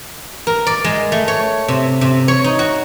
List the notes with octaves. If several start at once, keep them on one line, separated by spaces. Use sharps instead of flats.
A#4
D5
G#3
A3
C#5
C3
C3
C#5
D#4
F#4